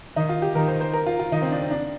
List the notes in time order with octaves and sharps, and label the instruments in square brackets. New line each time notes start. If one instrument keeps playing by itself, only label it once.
[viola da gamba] D#3 [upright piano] D#4
[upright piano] F4
G4
[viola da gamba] D#3 [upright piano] A#4
[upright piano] C5
C5
A#4
F4
F4
[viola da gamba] D#3 [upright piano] D#4
[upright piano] C4
D4
C4
D4